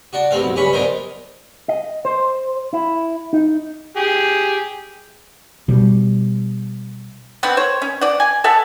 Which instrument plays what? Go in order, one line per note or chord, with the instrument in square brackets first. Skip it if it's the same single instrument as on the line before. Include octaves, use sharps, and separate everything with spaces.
[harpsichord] D4 F#4
C2 G2 A3 C4 F5
B1
C#2 G2 C#4 B5 C#6
B1 D4 D#4 A#4 C5
[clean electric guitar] D#5
C5
E4
D#4
[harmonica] G4 G#4
[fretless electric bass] B2 G3
[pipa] D3 B3 C4 F#5
C5 C#5
C#4
D5 F#5
G#5
A4 E5 F#5 A5